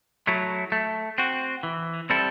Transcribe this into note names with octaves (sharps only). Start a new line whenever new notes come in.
F#3 A3 E4
A3
C4 F#4
E3
G3 C4 E4 A4